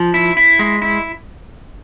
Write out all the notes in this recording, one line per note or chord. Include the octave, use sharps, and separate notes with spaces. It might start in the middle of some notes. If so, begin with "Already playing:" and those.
Already playing: F3
E4
E4
G#3
E4